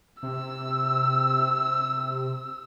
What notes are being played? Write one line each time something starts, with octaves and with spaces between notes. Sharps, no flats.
C3 E6